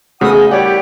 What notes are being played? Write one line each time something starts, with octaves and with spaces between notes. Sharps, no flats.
C#3 A3 B3 C4 F#4 F#5 D#6
G#3 C#4 G#4 D#5
D#3 G3 E4 G4 C#5 D5 F#5